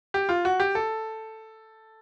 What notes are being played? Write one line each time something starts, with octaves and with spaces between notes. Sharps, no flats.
G4
F4
F#4
G4
A4